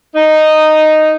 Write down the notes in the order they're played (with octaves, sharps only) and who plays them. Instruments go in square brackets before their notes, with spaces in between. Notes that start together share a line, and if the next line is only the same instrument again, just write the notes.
[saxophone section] D#4